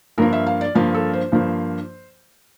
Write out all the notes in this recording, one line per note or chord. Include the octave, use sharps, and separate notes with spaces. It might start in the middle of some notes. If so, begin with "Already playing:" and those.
G2 F3 A#3 A#4
E5
F5
D5
G2 F3 A#3 F5
A4
C5
G2 F3 A#3